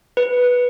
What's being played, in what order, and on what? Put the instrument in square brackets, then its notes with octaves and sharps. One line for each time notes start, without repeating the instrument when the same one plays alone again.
[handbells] B4